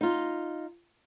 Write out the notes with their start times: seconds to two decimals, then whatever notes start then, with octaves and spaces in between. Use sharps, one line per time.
0.01 D#4 F4